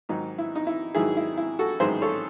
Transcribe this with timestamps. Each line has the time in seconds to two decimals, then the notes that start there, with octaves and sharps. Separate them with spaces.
0.09 G#2 D#3 F#3 D#4
0.38 E4
0.56 D#4
0.67 E4
0.95 G#2 D#3 F#3 E4 G#4
1.17 E4
1.37 E4
1.59 F#4 A4
1.80 A1 G#2 D#3 F#3 G#4 C5
2.02 A4 C#5